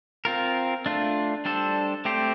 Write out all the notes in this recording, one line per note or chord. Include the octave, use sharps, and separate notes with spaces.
C4 F4 A#4
A3 D4 F4
G3 D4 A4 C5
A3 C4 G4 C5